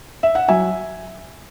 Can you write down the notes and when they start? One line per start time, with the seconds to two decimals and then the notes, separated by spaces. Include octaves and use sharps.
0.23 E5
0.35 F#5
0.48 F#3 E5 G#5